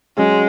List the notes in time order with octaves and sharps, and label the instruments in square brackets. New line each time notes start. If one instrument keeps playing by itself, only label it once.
[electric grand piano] F#3 C#4 G#4 [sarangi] G#3